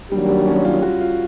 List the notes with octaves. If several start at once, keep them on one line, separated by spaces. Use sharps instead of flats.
D#3 F#3 G3 A#3 D4 G4
G3
C#4
F4
F#4
F4